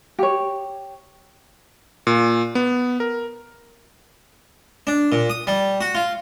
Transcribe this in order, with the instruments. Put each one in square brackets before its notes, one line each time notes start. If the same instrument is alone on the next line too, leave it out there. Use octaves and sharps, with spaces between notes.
[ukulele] G4 C#5
[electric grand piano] A#2
B3
A#4
[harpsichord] D4
A#2
D#6
G3
F#4
F4